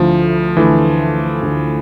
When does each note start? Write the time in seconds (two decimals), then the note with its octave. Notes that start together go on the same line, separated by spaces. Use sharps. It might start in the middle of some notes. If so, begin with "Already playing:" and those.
Already playing: D2 D3 F3 A3 E4
0.57 D2 D3 E3 A3 E4
1.42 D2 D3 A3 E4